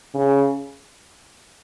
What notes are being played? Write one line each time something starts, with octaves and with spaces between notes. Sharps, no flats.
C#3